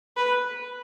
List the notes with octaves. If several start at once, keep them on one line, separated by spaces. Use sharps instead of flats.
B4